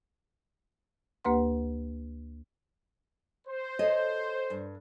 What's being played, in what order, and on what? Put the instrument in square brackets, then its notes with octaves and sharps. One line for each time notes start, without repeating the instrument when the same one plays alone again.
[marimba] D2 A#3 G4 B4 F#5 C6
[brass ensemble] C5
[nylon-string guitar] A4 C#5 D#5
G2